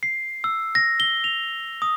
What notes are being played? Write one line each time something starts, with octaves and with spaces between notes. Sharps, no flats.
C7
E6
A#6
G7
F7
D#6